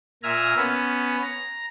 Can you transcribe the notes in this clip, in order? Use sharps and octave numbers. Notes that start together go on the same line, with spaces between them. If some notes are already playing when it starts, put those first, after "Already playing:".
A#2 E5 G#5 A#5 F6
B3 C#4
A#5